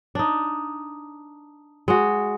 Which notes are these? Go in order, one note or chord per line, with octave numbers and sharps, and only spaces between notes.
D4 D#4
G#3 F#4